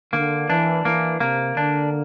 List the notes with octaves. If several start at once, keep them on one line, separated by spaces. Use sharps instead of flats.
D3 A#3
E3 D4
E3 A#3
C3 A#3
D3 D4